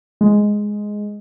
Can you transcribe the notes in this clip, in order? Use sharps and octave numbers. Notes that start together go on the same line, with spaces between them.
G#3